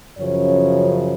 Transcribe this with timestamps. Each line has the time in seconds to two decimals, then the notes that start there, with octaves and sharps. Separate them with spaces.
0.18 F#2 C#3 F3 C#5